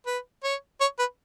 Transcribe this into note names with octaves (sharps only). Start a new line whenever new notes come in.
B4
C#5
C#5
B4